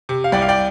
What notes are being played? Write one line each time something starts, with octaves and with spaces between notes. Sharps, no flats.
C3
F5
C2 D5 G5
F5
D5 G5